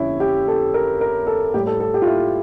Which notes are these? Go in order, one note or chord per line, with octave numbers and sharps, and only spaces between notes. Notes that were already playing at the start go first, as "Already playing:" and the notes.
Already playing: F2 D3 G3 C#4 E4
G4
A4
A#4
A#4
A4
A2 G3 G4
A4
A4
G4
F4
E4